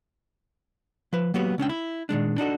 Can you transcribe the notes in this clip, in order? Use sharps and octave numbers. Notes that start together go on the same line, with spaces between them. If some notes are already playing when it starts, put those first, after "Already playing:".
F3 B4
F#3 A#3 B3 F#4 G4
C#2 C#4 D4 G5
E4
A#2 D#3 G#3 D4
D4 D#4 F#4 A4